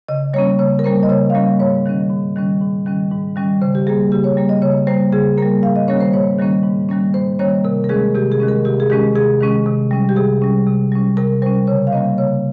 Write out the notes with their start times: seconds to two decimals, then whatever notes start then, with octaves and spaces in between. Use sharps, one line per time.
0.08 C#3 D#5
0.34 G3 A#3 C#4 C#5
0.59 C#3 C#5
0.79 A#4
0.84 G3 A#3 C#4 C5
1.03 D#5
1.09 C#3 C#5
1.30 F5
1.35 G3 A#3 C#4 D#5
1.59 G#2 C#5
1.86 D#3 G3 C#4
2.10 G#2
2.36 D#3 G3 C#4
2.61 G#2
2.86 D#3 G3 C#4
3.11 G#2
3.36 D#3 G3 C#4
3.61 C#3 C5
3.75 G4
3.87 G3 A#3 G#4
4.12 C#3 G4
4.24 C#5
4.37 G3 A#3
4.49 D#5
4.62 C#3 C#5
4.87 G3 A#3 C5
5.13 C#3 G#4
5.38 G3 A#3 A#4
5.63 G#2 F5
5.76 D#5
5.88 D#3 G3 A#3 C#4 C#5
6.00 C5
6.13 G#2 C#5
6.39 D#3 G3 A#3 C#4
6.63 G#2
6.89 D#3 G3 A#3 C#4
7.14 G#2 C5
7.39 D#3 G3 A#3 C#4 C#5
7.65 C3 A#4
7.84 A#4
7.89 D#3 G#3 C#4 G#4
8.15 C3 G4
8.32 G#4
8.40 D#3 G#3 C#4
8.49 A#4
8.65 C3 G4
8.80 G#4
8.90 D#3 G#3 C#4 G4
9.15 C3 G#4
9.41 D#3 G#3 C#4
9.66 C3
9.91 G3 C#4
10.09 G4
10.16 C3 G#4
10.42 G3 C#4
10.67 C3
10.92 G3 C#4
11.17 C3 A#4
11.42 G3 C#4 C5
11.67 C#3 C#5
11.87 F5
11.92 G3 A#3 C#4 D#5
12.18 C#3 C#5